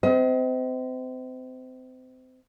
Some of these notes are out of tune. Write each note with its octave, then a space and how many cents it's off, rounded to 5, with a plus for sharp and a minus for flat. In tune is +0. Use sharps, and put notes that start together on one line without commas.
C4 -30 D#5 +35